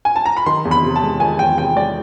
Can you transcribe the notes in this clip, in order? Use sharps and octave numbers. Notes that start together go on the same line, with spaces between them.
G#5
A5
A#5
B5
D#3 C6
E2
B5
C3
A5
G#3
D#3 G#5
E2 G5
C3 G5
G#3 D5